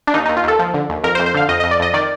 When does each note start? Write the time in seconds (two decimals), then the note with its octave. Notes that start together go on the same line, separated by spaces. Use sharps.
0.07 D4
0.14 D#2 D#4
0.26 D#2 D#4
0.37 F4
0.44 D#2 A4
0.59 F3
0.74 D3
0.89 D#2
1.04 F2 A#4
1.15 C5
1.19 F2
1.26 C5
1.34 D3 F5
1.49 F2 D#5
1.60 F2 D#5
1.71 D5
1.79 F2 D#5
1.93 D#3 D5